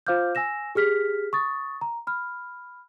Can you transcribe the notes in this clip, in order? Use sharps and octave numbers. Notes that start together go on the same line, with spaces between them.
F4 C5 F5 D6 F6 G6
G#5 E6 A#6 E7
G4 G#4 F6 B6
C#6 D#6 A6
A#5
B5 F6